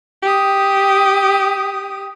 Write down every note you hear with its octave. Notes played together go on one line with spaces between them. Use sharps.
G4 D#6